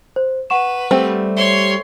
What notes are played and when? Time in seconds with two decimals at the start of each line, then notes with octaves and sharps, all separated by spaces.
0.16 C5
0.50 B4 F#5 C#6 E7
0.91 G3 A3 C4
1.36 C#5 E5 C6